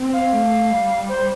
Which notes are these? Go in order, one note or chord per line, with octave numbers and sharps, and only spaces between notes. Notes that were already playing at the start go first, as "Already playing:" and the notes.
Already playing: C4
F5
A3
G3
C5